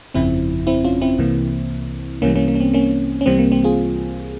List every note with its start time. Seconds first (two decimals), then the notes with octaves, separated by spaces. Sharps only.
0.14 G1 F2 C#3 F3 C4 E4
0.67 C4 E4
0.84 C#4 F4
1.02 C4 E4
1.18 C2 C3 E3 A#3
2.22 C2 C3 E3 G3 A#3 C#4
2.36 A#3 C#4
2.48 A#3
2.55 C#4
2.60 C4
2.73 A#3 C#4
3.21 C#4
3.26 C2 C3 E3 G3 A#3 C4
3.39 A#3
3.52 C4
3.64 F4 G#4